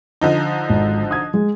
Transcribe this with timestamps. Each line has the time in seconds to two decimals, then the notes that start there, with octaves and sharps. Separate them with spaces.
0.21 D3 F3 D#4
0.69 G#1
1.11 D#6 G#6
1.34 G#3